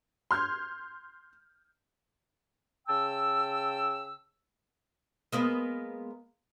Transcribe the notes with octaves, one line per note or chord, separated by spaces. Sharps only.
C6 F6 G6 G#6
C#3 G5 A5 E6
G#3 A#3 B3